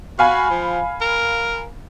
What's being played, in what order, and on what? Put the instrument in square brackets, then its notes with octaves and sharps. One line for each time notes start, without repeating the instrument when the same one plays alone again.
[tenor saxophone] F#4 [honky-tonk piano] F5 G#5 B5
[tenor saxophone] F3
A#4